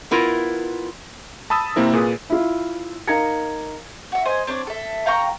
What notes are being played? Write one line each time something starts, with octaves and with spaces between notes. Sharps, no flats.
B3 E4 F4 A#4
A5 B5 D#6 E6 A6
C3 A#3 C4 E4 A#4
A#2 G#4 B4 D#6
E4 F4
D#4 A#4 F5 A#5 G#6 C#7
F#4 E5
C5 D#5 G#5
C4 D4 C#5 D5
A4 E5
F5 G5 A#5 C#6